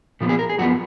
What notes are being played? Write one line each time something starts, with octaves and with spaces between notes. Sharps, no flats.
A#2 F3 B3
G#4
A#4
G#4
F#2 F3 B3 F#4